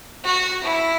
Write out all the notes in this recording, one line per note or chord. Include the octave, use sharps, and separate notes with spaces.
F#4
E4